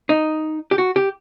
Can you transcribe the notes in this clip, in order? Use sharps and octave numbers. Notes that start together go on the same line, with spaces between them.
D#4
G4
F#4
G4